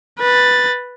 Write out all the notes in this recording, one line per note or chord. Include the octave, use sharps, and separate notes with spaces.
B4 A6